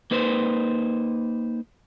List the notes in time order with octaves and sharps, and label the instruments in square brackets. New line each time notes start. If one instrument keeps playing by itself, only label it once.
[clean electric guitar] A#3 D#4 B4 C5